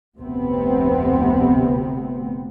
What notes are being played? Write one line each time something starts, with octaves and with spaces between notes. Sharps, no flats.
F1 D2 C3 B3 C4